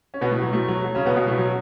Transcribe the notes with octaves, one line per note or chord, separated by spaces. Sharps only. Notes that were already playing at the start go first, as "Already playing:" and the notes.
C#4
B2 B3
A2 A3
F#3
A2 A3
F#3
F#3
C#3 C#4
B2 B3
B2 B3
A2 A3
F#3